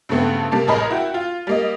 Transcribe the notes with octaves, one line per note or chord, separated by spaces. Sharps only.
G2 C#3 A3 B3 C4
C3 G3 A#3 A5
A1 G#4 A#4 D#5 B5
E4 F#4 G5
F4
G3 A#3 D#5